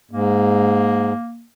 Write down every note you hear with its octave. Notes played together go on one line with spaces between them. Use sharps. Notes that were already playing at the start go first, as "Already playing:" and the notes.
G#2 A#3